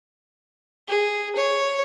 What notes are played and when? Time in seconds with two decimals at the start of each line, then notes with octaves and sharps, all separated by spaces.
0.88 G#4
1.36 C#5